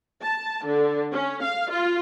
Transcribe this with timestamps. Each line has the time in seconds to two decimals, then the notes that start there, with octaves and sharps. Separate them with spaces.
0.22 A5
0.66 D3
1.13 C#4
1.43 F5
1.71 F4